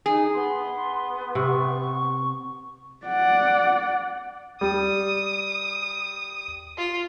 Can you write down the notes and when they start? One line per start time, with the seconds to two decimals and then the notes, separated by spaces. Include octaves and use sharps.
0.06 D#4 G#4
0.34 B3 C6
1.35 C3 C#6
3.06 D5 F#5
4.61 G3 D#6
6.78 F4